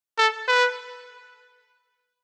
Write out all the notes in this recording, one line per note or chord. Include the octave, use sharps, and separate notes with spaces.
A4
B4